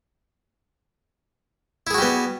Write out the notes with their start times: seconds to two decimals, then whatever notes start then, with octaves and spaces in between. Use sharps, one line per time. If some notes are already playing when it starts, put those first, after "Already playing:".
1.87 E4
1.91 G#4
1.94 F#4
1.98 G3
2.02 B3